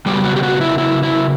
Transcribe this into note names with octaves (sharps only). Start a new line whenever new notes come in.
C#3 F#3 G3 B3 G4
F#4
G4
F#4
E4
E4
E4